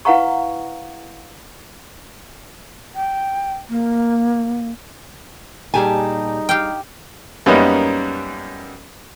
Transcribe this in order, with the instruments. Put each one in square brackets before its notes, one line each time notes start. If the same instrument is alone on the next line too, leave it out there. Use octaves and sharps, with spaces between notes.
[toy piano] E4 B4 F5 F#5 A#5 C#6
[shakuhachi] G5
A#3
[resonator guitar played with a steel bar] A#2 G4 A5 [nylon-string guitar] G3 G#4 G#5 [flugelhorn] D#4
[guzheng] G4 F5 G5
[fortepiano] F#2 G3 A#3 B3 C#4 D#4